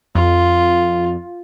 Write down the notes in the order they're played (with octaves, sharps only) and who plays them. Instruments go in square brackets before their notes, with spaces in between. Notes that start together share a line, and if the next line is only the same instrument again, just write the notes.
[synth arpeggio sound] F2 [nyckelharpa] F4